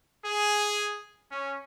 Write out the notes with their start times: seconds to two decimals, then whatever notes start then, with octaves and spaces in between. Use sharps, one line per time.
0.24 G#4
1.30 C#4